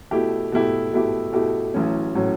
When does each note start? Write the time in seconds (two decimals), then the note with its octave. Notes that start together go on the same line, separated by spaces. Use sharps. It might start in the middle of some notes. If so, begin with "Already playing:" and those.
0.11 B2 A3 E4 G4
0.52 B2 A3 E4 G4
0.93 B2 A3 E4 G4
1.33 B2 A3 E4 G4
1.74 A1 A2 F#3 C#4
2.15 A2 F#3 C#4